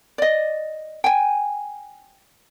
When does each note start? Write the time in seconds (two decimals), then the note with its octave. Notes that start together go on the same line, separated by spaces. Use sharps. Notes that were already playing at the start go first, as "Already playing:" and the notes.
0.18 D5 D#5
1.04 G5 G#5